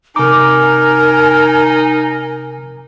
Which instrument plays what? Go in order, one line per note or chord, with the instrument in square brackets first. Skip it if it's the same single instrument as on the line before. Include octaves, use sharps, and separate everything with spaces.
[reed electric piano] C3 D6 [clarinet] D#4 [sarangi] A#4 [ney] G#5